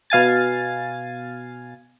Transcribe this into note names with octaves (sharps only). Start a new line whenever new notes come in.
B2 F5 G#5 A6